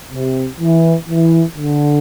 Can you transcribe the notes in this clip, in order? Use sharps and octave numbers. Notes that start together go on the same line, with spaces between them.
C3
E3
E3
D3